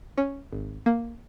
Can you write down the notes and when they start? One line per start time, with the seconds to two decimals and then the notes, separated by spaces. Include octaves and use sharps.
0.18 C#4
0.52 G#1
0.86 A#3